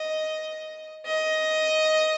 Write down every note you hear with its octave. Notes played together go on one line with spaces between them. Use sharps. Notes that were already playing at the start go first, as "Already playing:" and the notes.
Already playing: D#5
D#5